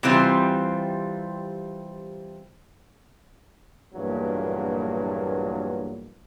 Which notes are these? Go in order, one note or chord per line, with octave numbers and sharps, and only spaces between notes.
C3 E3 G3 C4 F4
A#1 E2 G2 A#2 F#3